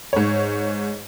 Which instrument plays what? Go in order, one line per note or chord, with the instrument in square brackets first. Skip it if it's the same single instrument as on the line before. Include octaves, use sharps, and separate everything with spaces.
[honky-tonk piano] G#2 C#5